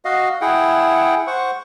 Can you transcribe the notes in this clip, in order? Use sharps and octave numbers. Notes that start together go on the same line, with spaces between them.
F#4 D#5 F5
E4 G#4 F#5 G5
C5 F#5 C#6